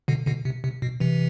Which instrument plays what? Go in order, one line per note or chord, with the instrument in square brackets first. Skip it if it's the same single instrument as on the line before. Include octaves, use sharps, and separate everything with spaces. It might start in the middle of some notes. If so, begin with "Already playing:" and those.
[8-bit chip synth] B2 D3
B2 D3
C3
C3
B2
C3 E3